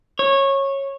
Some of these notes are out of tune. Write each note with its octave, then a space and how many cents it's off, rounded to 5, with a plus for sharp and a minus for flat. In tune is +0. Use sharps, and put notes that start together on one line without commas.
C#5 -15